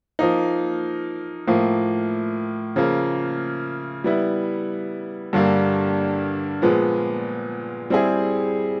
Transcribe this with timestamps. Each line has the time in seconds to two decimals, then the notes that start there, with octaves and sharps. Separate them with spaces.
0.19 F3 A#3 D#4
1.47 A2 F3 A#3
2.76 C#3 F3 A#3
4.04 G3 B3 E4
5.33 G2 D3 G3 A#3
6.62 A#2 F3 G#3 B3
7.90 G3 C4 E4 G#4